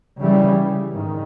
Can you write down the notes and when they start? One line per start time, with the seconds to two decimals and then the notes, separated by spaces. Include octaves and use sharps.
0.21 C#3 E3 G3
0.93 G#2 D#3